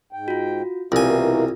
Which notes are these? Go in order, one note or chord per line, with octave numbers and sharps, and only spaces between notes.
G#2 G5
F4 F#4
C2 B2 E3 A#3 F4 G#5